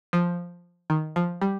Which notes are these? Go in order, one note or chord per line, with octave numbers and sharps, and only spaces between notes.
F3
D#3
F3
G3